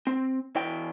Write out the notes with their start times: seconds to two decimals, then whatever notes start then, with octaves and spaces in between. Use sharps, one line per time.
0.07 C4
0.56 E2 E3 G5